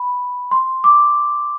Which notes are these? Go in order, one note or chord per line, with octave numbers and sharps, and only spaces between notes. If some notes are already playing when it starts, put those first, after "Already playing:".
Already playing: B5
C6
D6